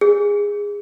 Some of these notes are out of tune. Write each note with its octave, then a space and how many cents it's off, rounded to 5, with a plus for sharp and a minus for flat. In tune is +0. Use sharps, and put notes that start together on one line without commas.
G#4 -20